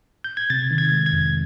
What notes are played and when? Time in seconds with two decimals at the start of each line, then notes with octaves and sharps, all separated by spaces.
0.24 G6
0.37 G#6
0.50 C3 A6
0.71 D#3
0.78 G#6
0.92 G#3
1.06 G#6
1.13 F2